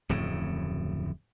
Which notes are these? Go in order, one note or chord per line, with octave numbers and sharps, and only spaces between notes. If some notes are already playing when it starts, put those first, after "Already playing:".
D1 F2 A2 C#3